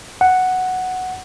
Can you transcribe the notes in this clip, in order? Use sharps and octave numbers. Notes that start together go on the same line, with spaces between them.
F#5